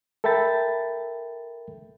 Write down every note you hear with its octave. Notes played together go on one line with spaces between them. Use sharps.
A4 A#4 E5 G5 B5 A6